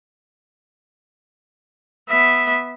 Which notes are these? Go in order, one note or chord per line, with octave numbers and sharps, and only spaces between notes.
B3 E5